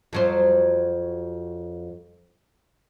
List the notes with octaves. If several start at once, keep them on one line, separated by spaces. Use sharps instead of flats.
F2 F#3 C5